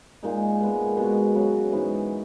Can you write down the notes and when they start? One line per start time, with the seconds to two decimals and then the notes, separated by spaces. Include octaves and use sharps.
0.23 A#2 G#3 D#4
0.60 A#2 G#3 B3
0.97 B2 G#3 B3 F#4
1.35 C#3 F#3 B3 F#4
1.72 G#2 E3 B3 D#4